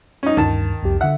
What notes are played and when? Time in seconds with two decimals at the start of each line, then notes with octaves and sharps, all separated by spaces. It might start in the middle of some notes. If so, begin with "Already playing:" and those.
0.23 C#4 D#4
0.37 D2 G2 D#3 A5
0.83 C2 F2 G4
1.01 D3 E5 F#5